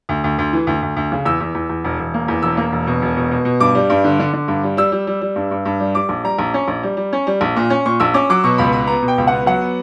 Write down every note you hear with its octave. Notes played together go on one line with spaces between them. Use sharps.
D2
D2
D2
E3
D2
D2
D2
C#3
E2 E6
E2
E2
E2
E1
E1
A#3
E2
E1 E6
A#3
E1
B2
E1
B2
B2
B2
G2 D6
G3
G2
D3
D3
D3
G2
G3
G3 E6
G3
G3
G3
G2
G2
G2
G3
G3 D6
A#1
G3 A#5
A#1
C#4
A#1
G3
G3
C#4
G3
A#1
A#2
C#4
A#2 C#6
A#1 E6
C#4 D6
F#3 D6
B2 C#6
C#2 B5
B3 B5
B3 A#5
B2
G5
C#2
B3 F#5
F#3 F#5
B3